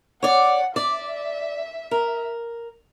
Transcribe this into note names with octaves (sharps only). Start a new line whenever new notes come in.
C#5 D5 F#5
D5 E5
A#4